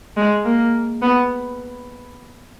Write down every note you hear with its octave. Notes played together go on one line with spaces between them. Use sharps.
G#3
A#3
B3